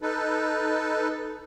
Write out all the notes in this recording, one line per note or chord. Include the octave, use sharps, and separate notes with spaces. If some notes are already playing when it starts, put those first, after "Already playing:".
D#4 A4 B4